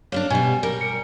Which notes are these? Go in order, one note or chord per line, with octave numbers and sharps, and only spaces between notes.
A#3 B3 D4 C#5
B2 G3 G#5
G3 A#4
C#7